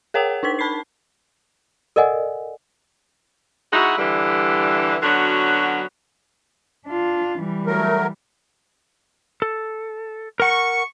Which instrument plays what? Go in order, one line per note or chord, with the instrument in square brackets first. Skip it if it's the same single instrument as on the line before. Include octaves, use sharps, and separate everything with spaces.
[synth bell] G#4 A#4 C#5 F#5 G5
D4 D#4 A#4 B6
A5 B5 B6 C7
[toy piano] A4 A#4 D5 D#5 F#5 G#5
[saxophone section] G#3 D#4 E4 F#4
D3 E3 G3
D3 F#3 B3 C#4 D4 F#4
[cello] D4 F4
E3 G3
[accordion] F#3 A3 A#4
[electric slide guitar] A4
[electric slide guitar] A#4 F#5 [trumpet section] C#6